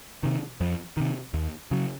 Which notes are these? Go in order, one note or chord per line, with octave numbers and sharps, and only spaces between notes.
C3 D#3
F2
C3 D#3
D#2
C#3 F#3